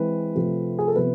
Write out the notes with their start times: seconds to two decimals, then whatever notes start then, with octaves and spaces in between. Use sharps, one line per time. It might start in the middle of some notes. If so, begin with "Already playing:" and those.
Already playing: E3 G#3 C4 B4
0.35 C3 F3 A3 C4
0.79 G#4
0.88 A4
0.96 C3 F3 B3 B4